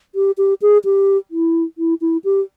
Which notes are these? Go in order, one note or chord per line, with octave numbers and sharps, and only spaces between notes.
G4
G4
G#4
G4
E4
E4
E4
G4